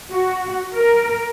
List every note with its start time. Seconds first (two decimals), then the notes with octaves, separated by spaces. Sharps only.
0.12 F#4
0.74 A#4